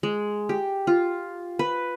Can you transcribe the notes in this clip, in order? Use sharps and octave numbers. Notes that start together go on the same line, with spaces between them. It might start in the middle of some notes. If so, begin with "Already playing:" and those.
G#3
G4
F4
B4